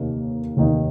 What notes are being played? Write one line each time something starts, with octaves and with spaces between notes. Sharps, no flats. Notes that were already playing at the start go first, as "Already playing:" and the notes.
Already playing: F1 D#2 D#3 A#3 D#4
F1 D#2 D#3 A#3 D#4